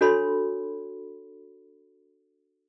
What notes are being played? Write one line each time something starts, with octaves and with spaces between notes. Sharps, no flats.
D4 F#4 A4 C#5 B5 C6